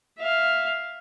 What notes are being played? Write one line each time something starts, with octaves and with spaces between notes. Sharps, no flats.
E5 F5